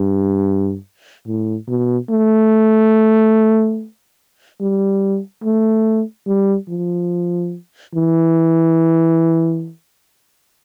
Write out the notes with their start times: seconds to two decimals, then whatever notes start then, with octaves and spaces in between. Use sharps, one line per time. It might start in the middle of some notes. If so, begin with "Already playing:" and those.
Already playing: G2
1.27 A2
1.68 B2
2.10 A3
4.60 G3
5.44 A3
6.27 G3
6.68 F3
7.95 E3